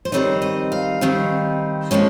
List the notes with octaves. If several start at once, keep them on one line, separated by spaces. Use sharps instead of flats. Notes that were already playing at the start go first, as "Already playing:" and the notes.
C5
D#3 G3 C4 D#4 C#5
D#5
F5
D#3 G3 C4 D#4
A#2 F3 G#3 C#4